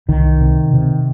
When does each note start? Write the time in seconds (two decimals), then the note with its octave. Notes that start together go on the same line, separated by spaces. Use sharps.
0.08 C2 D#3
0.41 C3
0.73 C3